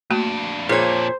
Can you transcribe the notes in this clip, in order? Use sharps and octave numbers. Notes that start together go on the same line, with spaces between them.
F2 A3 A#3 D4 F#4
A#2 G#4 C5 C#5